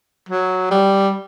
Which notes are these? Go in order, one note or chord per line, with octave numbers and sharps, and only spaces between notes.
F#3
G3